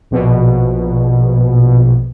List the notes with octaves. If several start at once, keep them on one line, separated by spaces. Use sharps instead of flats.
A#1 B2